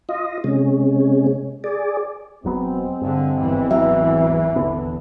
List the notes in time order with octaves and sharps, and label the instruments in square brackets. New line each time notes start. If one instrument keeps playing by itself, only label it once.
[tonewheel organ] F4 D#5
C3 G#3 C#4
G#4 D5
[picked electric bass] E1 F#3 B3 [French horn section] G#3 C4
[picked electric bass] G2 [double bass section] D3
[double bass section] G#1 E2 E3
[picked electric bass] F#3 B3 [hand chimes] E5
[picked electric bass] D#1 D3 B3